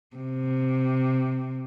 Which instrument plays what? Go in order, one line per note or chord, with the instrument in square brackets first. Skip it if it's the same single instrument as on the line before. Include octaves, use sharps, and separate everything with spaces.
[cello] C3